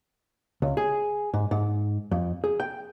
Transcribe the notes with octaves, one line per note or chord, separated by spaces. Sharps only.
C#2
G#4
G#2
G#2
F2
G#4
G5